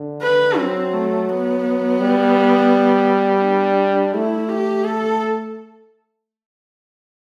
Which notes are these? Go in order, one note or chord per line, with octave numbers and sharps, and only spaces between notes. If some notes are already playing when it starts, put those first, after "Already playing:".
Already playing: D3
B4
F#3 C4
A3
B3
G3
D4
A3 E4
G4
A4